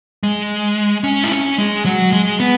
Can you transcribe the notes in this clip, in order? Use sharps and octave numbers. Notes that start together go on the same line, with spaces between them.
G#3
C#4
E4
C#4
G#3
F#3
G#3
B3